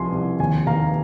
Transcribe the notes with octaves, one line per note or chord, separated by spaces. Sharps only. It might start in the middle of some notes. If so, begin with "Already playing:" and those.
Already playing: C2 F3 G#5 C6
C2
D#2 G#5
D#2 F5 A#5